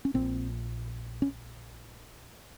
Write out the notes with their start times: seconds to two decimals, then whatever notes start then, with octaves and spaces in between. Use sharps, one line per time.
0.05 C#4
0.14 A#1 A#2 C4
1.22 C#4